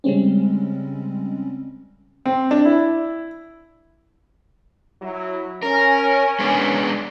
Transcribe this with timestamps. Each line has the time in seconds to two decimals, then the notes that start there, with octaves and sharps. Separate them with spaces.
0.04 C#3 G3 G#3 C4 C#4
2.26 C4
2.51 D4
2.65 E4
5.02 F#3 E4
5.62 C#4 A#4
6.39 G#3 B3 D4